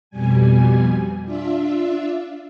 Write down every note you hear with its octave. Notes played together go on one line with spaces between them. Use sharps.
F2 B2 G3 G#5
D4 F4 E5